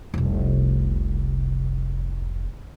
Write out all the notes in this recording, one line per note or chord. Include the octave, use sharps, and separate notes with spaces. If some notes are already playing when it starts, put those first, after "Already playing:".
F1 C2